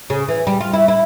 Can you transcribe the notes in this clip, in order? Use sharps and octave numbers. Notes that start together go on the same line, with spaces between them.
C#3
E3
G3
F4
E4
E4